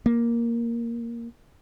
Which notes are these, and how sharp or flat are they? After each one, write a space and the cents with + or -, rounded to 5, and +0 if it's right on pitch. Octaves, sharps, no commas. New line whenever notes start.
A#3 +5